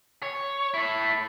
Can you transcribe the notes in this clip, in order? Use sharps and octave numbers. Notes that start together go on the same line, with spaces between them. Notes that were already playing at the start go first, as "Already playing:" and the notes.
C#5
E4 A4